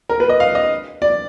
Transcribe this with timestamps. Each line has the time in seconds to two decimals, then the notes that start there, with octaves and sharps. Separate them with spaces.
0.09 A#4
0.20 B4
0.29 D#5
0.40 F5
0.55 D#5
1.02 D5